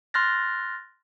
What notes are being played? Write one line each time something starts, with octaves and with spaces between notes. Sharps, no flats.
C6 F6 F#6 A6 A#6